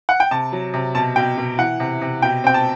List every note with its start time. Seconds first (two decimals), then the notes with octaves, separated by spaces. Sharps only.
0.09 F#5
0.20 G5
0.31 C3 A5
0.53 F#3
0.74 C3
0.95 B2 A5
1.16 B2 G5
1.38 B2
1.58 E3 F#5
1.80 C3
2.02 C3
2.22 B2 G5
2.44 C4 G5
2.54 A5